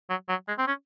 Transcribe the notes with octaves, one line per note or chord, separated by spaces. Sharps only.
F#3
F#3
G#3
C4
C#4